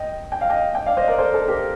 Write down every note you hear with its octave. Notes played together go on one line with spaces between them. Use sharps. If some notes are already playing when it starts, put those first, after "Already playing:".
Already playing: D#5 G5
G5
F5
D#5 G5
D#5 G5
D5 F5
C5 D#5
A#4 D5
A4 C5
A4
G4 A#4